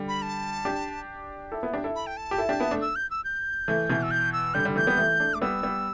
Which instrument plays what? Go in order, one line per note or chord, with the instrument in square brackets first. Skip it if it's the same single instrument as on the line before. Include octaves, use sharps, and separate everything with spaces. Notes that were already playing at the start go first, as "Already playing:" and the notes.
Already playing: [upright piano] D3 G3
[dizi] B5
A5
[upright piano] D4 G4
E4 A4
B3 E4
D4 G4
E4 A4
[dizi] B5
G5
A5
[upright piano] G4
E4 A4
D4 G4
B3 E4
A3 D4
[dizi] E6
G6
E6
G6
[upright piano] E3 A3
B2 E3
[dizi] E6
G6
E6
[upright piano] D3 G3 [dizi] G6
[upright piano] D3 G3
[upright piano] E3 A3 [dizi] G6
[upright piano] G3 B3
E3 A3
A3 D4
[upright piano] A3 [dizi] D6
[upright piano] G3 B3 [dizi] E6
[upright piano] G3 B3